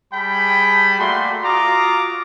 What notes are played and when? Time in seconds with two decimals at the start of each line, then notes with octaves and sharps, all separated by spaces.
0.12 G3 G#4 G5 A5 B5
0.99 A3 A#3 F#4 D5 C6
1.43 F4 F#4 A#5 D6 D#6